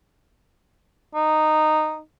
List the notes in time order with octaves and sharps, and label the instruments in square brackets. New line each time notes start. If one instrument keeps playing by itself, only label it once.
[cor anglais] D#4